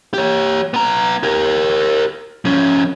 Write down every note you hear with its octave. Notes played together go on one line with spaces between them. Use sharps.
G4 C#5
B3 A#5
G4 A#4
F3 C#4